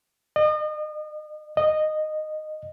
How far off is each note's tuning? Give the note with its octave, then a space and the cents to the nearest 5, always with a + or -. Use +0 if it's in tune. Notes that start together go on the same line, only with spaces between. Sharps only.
D#5 -40
D#5 -15